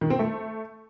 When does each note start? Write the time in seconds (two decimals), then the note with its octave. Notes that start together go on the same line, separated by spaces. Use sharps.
0.01 D#3
0.10 C4
0.19 A3